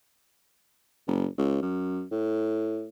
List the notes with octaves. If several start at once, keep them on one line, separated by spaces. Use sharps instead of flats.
F#1
C#2
F#2
A2